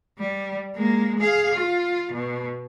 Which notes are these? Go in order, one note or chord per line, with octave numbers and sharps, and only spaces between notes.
G3
G#3 A#3
G#4 F5
F4
B2